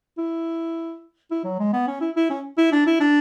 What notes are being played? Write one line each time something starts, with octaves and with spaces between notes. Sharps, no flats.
E4
E4
F#3
G#3
B3
C#4
E4
E4
C#4
E4
D4
E4
D4